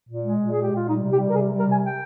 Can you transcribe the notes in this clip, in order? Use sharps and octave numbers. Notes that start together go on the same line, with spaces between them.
A#2
G#3
A#2
G#4
G#3
G4
A#2 F4
G3 D#4
C3
G4
G3
A#4
C3 G#4
G3
A#4
C3 G#5
G5